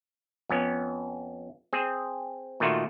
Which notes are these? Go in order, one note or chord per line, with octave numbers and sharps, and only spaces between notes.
F2 B3 C#4
C4 G#4
A#2 D#3 A3 F4 F#4